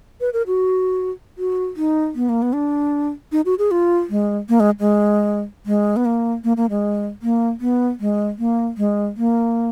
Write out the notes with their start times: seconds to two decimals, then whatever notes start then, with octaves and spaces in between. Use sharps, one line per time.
0.21 B4
0.33 A#4
0.47 F#4
1.38 F#4
1.77 D#4
2.15 B3
2.29 A#3
2.42 B3
2.54 D4
3.32 D#4
3.46 F#4
3.59 G#4
3.71 F4
4.10 G#3
4.49 A#3
4.60 G#3
4.80 G#3
5.66 G#3
5.96 B3
6.05 A#3
6.44 A#3
6.57 A#3
6.70 G#3
7.22 A#3
7.61 B3
8.00 G#3
8.39 A#3
8.77 G#3
9.17 A#3